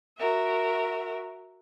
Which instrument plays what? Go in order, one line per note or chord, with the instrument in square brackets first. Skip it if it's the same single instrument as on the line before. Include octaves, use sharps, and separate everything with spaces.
[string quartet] F#4 A#4 E5